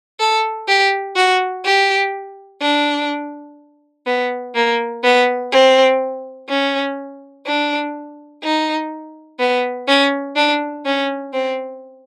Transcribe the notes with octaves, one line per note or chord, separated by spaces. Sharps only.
A4
G4
F#4
G4
D4
B3
A#3
B3
C4
C#4
D4
D#4
B3
C#4
D4
C#4
C4